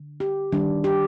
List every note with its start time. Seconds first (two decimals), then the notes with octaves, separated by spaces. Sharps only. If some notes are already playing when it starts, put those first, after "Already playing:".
Already playing: D3
0.20 G4
0.52 D#3 G3 D4
0.84 G4